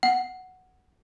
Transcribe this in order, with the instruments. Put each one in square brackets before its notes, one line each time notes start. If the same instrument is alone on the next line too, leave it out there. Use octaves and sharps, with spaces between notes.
[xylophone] F#5